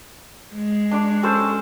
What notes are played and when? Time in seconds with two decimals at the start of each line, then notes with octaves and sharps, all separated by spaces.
0.55 G#3
0.91 D4 D6
1.23 C#4 A4 C5